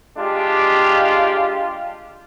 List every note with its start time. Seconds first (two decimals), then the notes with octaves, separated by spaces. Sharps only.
0.17 G#3 D4 F4 G4